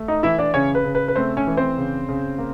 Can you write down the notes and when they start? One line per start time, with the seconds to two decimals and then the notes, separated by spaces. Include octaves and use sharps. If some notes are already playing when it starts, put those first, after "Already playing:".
Already playing: A3
0.08 D#4 D#5
0.23 E3 E4 E5
0.38 D4 D5
0.54 C#3 C#4 C#5
0.75 B4
0.85 C#3
0.95 B4
1.08 B4
1.15 A3 C4 C5
1.37 C#4 C#5
1.47 E3
1.57 C4 C5
1.78 C#3
2.09 C#3
2.38 A#3